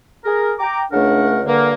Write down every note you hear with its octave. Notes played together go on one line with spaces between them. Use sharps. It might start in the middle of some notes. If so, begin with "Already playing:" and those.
G#4 A#4
G5 A#5 D6
C#2 C#3 A3 D4 A#4 F#5
G2 D3 A#3